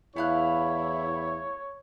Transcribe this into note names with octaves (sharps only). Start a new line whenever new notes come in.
E2 A3 E4 C#5 F5 F#6